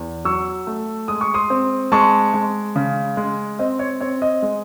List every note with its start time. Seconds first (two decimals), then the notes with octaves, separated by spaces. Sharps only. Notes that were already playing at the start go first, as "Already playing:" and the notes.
Already playing: E2
0.25 F#3 C#6 E6
0.67 A3
1.08 G#3 D#6
1.21 C#6
1.34 C6 D#6
1.50 C4
1.92 G#3 A5 C#6
2.34 G#3
2.76 C#3
3.17 G#3
3.59 C4 D#5
3.79 C#5
4.00 C4 C#5
4.22 D#5
4.42 G#3